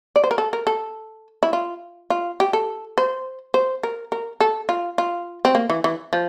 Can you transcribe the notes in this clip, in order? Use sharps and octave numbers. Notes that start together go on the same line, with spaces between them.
D5
C5
A#4
A4
A#4
A4
E4
F4
F4
G4
A4
C5
C5
A#4
A#4
A4
F4
F4
C4
A#3
E3
E3
F3